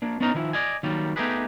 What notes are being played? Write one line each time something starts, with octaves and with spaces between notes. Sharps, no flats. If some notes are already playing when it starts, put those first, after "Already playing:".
A#3 D4
B3 C#4 D#4 A#4 D#5 A#5
D#3 F3 E4
D5 D#5 G#5
D#3 F#3 G3 A#3
A3 B3 D#4 G4 G#4 B4